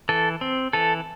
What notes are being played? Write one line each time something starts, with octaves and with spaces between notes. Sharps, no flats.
E3 A4
C4
E3 A4